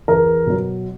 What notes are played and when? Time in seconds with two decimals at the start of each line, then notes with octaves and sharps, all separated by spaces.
0.08 E2 A#4
0.46 B2 F#3